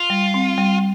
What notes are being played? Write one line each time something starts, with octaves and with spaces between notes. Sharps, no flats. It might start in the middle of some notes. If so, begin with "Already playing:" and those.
Already playing: F4
G3
C4
G3